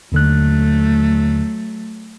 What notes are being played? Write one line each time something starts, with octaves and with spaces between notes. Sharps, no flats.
D#2 D3 F#3 A3 F#6